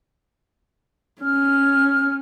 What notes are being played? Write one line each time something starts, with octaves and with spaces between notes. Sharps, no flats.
C#4 F6